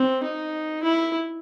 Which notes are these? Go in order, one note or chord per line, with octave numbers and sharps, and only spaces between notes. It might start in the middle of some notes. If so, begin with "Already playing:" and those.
Already playing: C4
D#4
E4